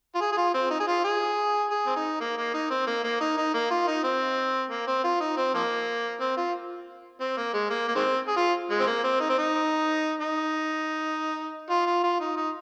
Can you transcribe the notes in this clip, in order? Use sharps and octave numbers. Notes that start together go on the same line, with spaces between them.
F4
G#4
G#4
F4
C4
D#4
G#4
F4
G#4
G#4
C4
D#4
A#3
A#3
D#4
C4
A#3
A#3
D#4
D#4
A#3
F4
D#4
C4
A#3
C4
F4
D#4
C4
F3 A#3
C4
F4
C4
A#3
G#3
A#3
A#3
D#3 G#3 C4
G#4
F4
G#3
C4
A#3
C4
D#4
C4
D#4
D#4
F4
F4
F4
D#4
D#4